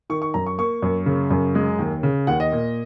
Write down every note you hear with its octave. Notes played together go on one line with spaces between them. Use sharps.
D#3 C#6
C#6
F#2 A#5
C#6
A#3 C#6
F#2
C#3
F#2
G#3
D#2
C#3
D#2 F#5
D#5
A#2